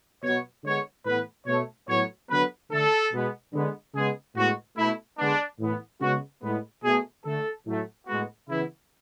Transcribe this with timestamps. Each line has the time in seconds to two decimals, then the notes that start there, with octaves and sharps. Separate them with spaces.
0.23 B2 F#3 B3 C#5
0.64 D3 G#3 B3 C#5
1.05 A2 E3 B3 B4
1.46 B2 A3 C#5
1.88 A2 F#3 B3 C#5
2.29 D3 F#3 B3 B4
2.70 D3 A3 A4
3.12 B2 G#3 B3
3.53 D3 G#3 B3
3.95 C#3 G#3 B3 G#4
4.35 A2 G#3 B3 F#4
4.76 B2 A3 E4
5.18 D3 G#3 B3 D4
5.60 A2 E3 B3
6.01 C#3 G#3 B3 F#4
6.42 A2 G#3 B3
6.83 B2 A3 G#4
7.25 D3 A3 A4
7.66 A2 F#3 A3
8.07 A2 G#3 B3 F#4
8.48 C#3 E3 B3 E4